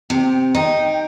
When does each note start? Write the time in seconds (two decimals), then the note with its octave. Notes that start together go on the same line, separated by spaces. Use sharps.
0.10 C3 G5
0.54 D#4 G5